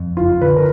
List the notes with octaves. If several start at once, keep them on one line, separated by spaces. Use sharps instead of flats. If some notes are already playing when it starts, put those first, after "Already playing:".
Already playing: F2
F#1 F4
D3 B4
A#4